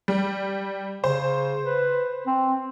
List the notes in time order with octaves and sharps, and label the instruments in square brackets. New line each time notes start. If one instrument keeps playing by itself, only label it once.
[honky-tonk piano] G3
[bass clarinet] C#3 [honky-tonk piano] C5
[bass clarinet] B4
C4